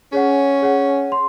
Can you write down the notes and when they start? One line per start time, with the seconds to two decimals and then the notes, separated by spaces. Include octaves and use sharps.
0.12 C#4 G#4 C#5 F#5
0.62 G#4 C#5 F#5
1.12 C6